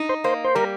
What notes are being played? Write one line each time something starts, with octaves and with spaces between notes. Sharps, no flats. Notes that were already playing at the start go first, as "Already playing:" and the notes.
Already playing: D#4
C5
A#3 C5
C5
G3 A#4